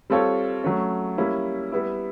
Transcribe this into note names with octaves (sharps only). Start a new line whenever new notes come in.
G3 C4 F4 A4 C#5
F#3 A3 C#4
G3 A#3 C#4 E4
G3 B3 E4